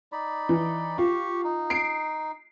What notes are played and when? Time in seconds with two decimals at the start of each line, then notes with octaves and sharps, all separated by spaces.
0.12 D#4 D5 B5
0.49 E3
0.98 F4 G4 C#6
1.44 D#4
1.70 C7 D7